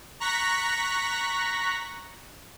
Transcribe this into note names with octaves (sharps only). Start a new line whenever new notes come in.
A#5 C#6 F#6 A#6 B6